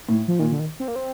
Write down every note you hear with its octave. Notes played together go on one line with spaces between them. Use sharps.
A2
F3
A#2 D#3
D3
D#3
C4
A#3
C4